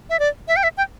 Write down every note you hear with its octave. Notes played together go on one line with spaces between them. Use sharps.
E5
D5
E5
G5
E5
G5